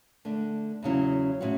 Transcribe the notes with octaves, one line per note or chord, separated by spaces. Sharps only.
D3 A3 D4
E2 C#3 F#3 C#4 E4
A2 G#3 C#4 F#4